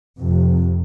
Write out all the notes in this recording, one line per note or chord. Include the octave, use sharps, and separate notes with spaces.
F2 C3